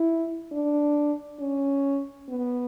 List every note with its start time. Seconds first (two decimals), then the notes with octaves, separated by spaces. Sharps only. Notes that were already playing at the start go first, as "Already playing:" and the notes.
Already playing: E4
0.52 D4
1.40 C#4
2.29 B3